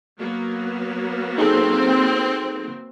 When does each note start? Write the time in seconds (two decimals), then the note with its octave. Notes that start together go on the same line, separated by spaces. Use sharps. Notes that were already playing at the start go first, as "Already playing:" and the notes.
0.19 F#3 A#3 B3
1.38 C4 D#4 G#4 A4